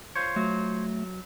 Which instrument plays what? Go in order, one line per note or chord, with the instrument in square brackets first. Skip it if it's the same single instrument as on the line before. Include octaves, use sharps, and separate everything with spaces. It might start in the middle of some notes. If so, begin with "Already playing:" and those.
[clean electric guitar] F4 C5 C#5
[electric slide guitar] F#3 [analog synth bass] A3